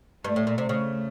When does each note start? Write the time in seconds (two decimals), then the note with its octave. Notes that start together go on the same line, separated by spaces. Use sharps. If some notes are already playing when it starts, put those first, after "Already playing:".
0.24 G2 A3
0.36 A2
0.47 A#2
0.58 C3
0.69 C#3 A3